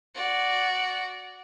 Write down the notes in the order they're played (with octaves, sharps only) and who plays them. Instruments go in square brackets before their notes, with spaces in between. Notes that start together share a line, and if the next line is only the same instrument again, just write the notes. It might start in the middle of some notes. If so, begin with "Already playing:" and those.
[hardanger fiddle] F#4 D5